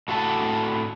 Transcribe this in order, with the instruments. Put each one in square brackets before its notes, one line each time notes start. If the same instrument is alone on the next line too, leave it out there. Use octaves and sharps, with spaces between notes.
[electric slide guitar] A2 F#4 A4 F5 A5